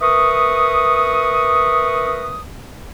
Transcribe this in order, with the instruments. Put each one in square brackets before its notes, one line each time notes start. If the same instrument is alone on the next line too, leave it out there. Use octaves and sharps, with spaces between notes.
[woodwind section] A#4 B4 E5 C#6 D#6